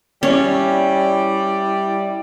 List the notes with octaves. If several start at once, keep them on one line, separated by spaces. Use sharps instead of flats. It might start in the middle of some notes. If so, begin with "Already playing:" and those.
G3 C#4 E4 D5